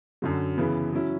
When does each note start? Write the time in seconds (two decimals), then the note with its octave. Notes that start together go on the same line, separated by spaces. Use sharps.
0.22 F#2 D3 F#3
0.57 C#3 E3 B3
0.93 F#3 C#4 E4